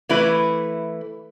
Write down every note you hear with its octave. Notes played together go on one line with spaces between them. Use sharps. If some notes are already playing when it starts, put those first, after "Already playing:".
E3 A3 E4 B4